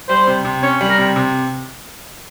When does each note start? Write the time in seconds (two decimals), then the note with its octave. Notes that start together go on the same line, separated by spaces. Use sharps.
0.09 G3 C5
0.27 C3
0.45 C3
0.62 C#4 C#5
0.81 G3
0.89 A#4
0.98 C3
1.16 C3